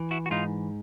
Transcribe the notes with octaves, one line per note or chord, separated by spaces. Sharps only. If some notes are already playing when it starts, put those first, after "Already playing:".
Already playing: E3
E4 F#4
F#4
G#2 D#4 F4